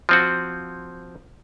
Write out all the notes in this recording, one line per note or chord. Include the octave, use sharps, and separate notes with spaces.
F3 C4 F#4